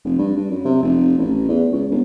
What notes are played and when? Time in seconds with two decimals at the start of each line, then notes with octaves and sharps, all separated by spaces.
0.05 F1
0.19 G2
0.37 G2
0.51 F#2
0.65 C3
0.82 F1
1.18 A1
1.49 E2
1.73 C#2
1.91 G1